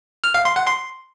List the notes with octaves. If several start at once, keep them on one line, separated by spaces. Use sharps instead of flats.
F6
F5
C6
F#5
C6